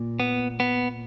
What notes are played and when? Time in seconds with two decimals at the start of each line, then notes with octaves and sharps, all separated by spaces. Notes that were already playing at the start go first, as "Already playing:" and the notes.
Already playing: A#2
0.20 B3
0.60 B3